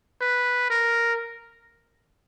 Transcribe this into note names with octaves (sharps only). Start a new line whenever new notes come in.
B4
A#4